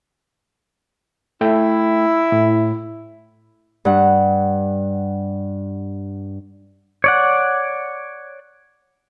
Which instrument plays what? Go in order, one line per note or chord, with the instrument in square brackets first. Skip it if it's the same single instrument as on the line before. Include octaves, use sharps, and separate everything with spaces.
[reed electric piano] A3 G5 [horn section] E4
[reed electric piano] A2
[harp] G2 F#5
[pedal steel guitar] C#5 D5 F#5